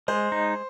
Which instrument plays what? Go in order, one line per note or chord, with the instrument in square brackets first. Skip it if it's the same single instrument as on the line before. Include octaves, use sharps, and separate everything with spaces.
[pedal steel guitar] G#3 [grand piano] C5
[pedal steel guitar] D#4